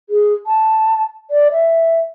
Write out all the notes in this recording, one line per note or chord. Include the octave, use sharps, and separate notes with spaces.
G#4
A5
D5
E5